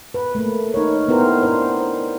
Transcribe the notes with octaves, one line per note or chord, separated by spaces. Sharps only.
B4
A3 A#3
D#4 A#4 C#5
B3 E4 G4 A#4 C5
D4 C5